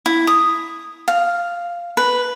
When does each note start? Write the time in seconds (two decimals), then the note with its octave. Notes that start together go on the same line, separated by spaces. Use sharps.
0.06 E4
0.27 D#6
1.08 F5
1.97 B4